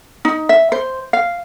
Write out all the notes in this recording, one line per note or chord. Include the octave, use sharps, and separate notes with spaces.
D#4
E5
C5
F5